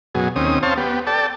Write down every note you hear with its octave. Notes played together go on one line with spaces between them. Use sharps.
F#2 B2 G#4
D#2 C4 C#4 D#6
C4 C5 C#5 F5 A5
B3 G4
A4 D5 G5 A5